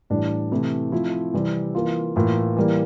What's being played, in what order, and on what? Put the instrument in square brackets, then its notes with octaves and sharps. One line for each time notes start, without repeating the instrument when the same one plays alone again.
[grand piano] A2 E3 G3 D4
C3 E3 A3 E4
F3 A3 C4 E4
C3 E3 G3 C4
E3 A#3 F4
A2 E3 A#3 F4
E3 G3 A#3